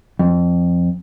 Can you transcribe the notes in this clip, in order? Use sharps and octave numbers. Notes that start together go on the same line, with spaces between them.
F2